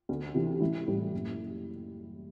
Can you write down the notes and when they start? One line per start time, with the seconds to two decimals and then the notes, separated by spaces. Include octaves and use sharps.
0.09 D2
0.35 C3 E3
0.61 A1 E4
0.88 A2 G3
1.13 F#1